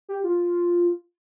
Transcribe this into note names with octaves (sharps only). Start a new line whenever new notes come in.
G4
F4